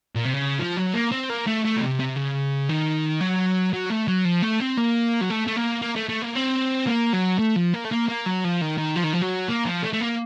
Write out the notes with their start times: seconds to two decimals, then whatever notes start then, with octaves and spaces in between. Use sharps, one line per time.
0.15 A#2
0.25 C3
0.34 C#3
0.59 F3
0.77 F#3
0.94 A#3
1.11 C4
1.30 A#3
1.47 A3
1.65 A3
1.77 A#2
1.81 C3
1.99 C3
2.16 C#3
2.69 D#3
3.21 F#3
3.73 F#3
3.90 A3
4.08 F#3
4.25 F3
4.42 A3
4.60 C4
4.77 A#3
5.21 F#3
5.30 A3
5.47 A3
5.56 A#3
5.82 A#3
5.96 A3
6.09 A3
6.22 A#3
6.35 C4
6.87 A#3
7.13 F#3
7.39 A3
7.56 F3
7.73 A#3
7.84 A3
7.91 A#3
8.08 A#3
8.26 F#3
8.44 F3
8.61 D#3
8.78 D#3
8.96 F3
9.04 D#3
9.13 F3
9.22 F#3
9.48 A#3
9.65 F3
9.83 A3
9.93 A3
10.01 A#3